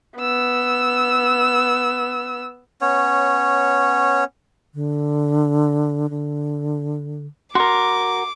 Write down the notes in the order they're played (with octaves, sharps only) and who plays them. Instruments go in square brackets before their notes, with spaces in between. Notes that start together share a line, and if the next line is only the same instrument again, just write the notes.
[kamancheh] B3 E6
[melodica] B3 C#4 C#5
[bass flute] D3
D3
[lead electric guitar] F#4 A#4 [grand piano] C6 [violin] D6